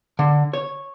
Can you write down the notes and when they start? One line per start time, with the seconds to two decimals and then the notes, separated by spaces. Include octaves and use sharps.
0.19 D3
0.53 C#5